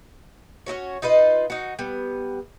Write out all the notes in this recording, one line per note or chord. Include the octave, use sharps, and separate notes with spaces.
C#4 E4 F#4 C#5
D#4 F4 B4 D#5
D#4 F#4
G3 B3